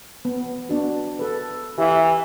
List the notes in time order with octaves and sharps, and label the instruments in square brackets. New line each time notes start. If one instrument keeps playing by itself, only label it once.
[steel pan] B3
B3 D4 F#4
A4 B4
[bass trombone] E3 [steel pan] G4 E5 F5